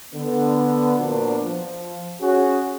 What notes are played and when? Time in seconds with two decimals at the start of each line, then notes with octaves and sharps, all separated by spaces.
0.14 D3 B3
0.99 A#2 F3 A#3 B3 D4 F#4
1.45 F3
2.21 C#4 F#4 G#4